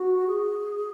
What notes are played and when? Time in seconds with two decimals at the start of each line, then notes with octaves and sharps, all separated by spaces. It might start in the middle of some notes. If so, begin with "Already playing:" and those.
Already playing: F#4
0.27 G#4